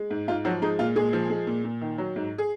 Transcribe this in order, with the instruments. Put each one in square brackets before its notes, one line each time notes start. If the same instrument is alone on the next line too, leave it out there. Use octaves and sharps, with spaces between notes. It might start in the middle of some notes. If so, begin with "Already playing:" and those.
Already playing: [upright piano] G#3
G#2
G#2 F4
F3 F#3 F#4
G#3 D#4
A#2 F4
A#2 G#3 G#4
F3
G#3
A#2
A#2
D#3
F#3
G#2
G#4